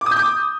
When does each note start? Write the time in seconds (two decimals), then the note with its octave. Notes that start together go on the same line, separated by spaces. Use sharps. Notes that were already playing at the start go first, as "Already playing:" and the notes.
0.01 D6
0.06 D#6
0.11 G6
0.17 D6